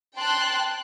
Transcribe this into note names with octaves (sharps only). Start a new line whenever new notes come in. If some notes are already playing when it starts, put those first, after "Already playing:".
G5 A5 C6 F#6